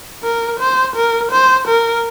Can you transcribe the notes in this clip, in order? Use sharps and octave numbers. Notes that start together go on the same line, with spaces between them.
A#4
C5
A#4
C5
A#4